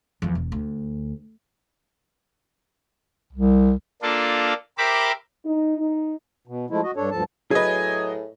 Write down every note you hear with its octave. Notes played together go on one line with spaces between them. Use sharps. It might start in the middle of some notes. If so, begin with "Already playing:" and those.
E2 F3
E1
D2
C2
A#3 D4 F4 A4
G4 A#4 C5 E5 B5 D6
D#4
D#4
B2
F3 G#3 A3 E4
F#4 D#5
G2 D4 A4 C#5
D2 G2 F3 A4 A5
A2 F#3 G#4 B4 D#5 G#5